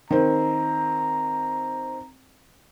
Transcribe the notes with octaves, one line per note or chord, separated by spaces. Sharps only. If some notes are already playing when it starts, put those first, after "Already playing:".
D#3 C4 A#5